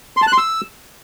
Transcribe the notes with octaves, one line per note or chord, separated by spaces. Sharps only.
C6
A5
F#6
C6
E6